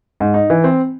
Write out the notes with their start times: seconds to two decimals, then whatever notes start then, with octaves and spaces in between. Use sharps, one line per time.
0.20 G#2
0.34 D#4
0.50 E3
0.64 C4